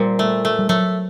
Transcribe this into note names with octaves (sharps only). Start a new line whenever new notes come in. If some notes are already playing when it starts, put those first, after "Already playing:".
Already playing: A#2 G3 C4
A3
A3
G3
F#3 A3